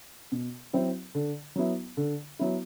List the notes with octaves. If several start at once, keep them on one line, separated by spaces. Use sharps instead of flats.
B2
F#3 C4 E4
D3
F#3 B3 E4
D3
F#3 B3 E4